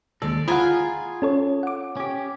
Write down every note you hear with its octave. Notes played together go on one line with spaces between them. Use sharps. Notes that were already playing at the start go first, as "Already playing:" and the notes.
D#2 G#3 A4 D5
F4 G#4 F#5 G#5 A#5 B5
C#4 A4 C#5
F#5 D6
C#4 G4